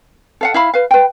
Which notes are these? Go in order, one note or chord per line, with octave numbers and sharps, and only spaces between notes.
A4 F5 F#5
E4 F5 B5
B4 F5
B4 G5